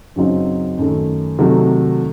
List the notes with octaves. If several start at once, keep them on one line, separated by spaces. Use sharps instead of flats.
F#2 C#3 F#3 C4 D#4
F#2 D#3 A3
C3 D#3 F#3 A3